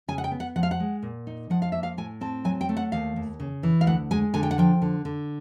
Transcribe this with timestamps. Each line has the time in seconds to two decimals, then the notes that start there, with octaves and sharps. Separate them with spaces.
0.08 C#3 G#5
0.18 F#5
0.24 G5
0.32 B3
0.40 F#5
0.56 F3 F#5
0.63 F5
0.71 F#5
0.80 G#3
1.03 A#2
1.27 D#4
1.50 F3 F#5
1.62 F5
1.72 A#3 E5
1.83 F5
1.97 A2 G#5
2.21 C4 A5
2.44 F#3 G#5
2.61 G5
2.69 A3
2.77 F#5
2.92 D#2 F5
3.16 D#2
3.40 C#3
3.63 E3
3.81 F5
3.87 D2 F#5
4.11 G#3 G#5
4.34 D3 G#5
4.43 G5
4.51 F#5
4.58 F3 G5
4.82 D3
5.05 D3